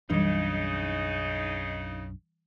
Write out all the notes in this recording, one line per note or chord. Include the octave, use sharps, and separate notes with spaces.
B1 F#2 C#3 E3 G3 D4 D#4